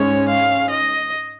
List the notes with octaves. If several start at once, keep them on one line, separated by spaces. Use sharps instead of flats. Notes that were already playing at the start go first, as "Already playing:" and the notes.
Already playing: G#2 G#3 C#4 C#5
F5
D#5